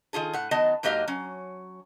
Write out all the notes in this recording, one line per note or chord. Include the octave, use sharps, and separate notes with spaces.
D#3 F4 G#4 A4
A2 F#5
D#3 F#3 B3 D#5 A5
G#2 F#3 A#3 G4 D#5 F5
F#3 C#4